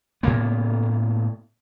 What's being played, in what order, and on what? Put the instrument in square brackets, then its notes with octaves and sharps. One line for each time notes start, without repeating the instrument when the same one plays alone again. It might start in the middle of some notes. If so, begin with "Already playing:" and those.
[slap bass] A2 C#3 A#3 B3